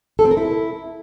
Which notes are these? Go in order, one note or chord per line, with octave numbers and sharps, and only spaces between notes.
A4
C4
A#4
E4